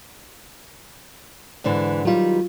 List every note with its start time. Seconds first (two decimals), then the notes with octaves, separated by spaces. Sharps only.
1.64 G#2 D3 E3
2.05 D#3 F#3 G3 F4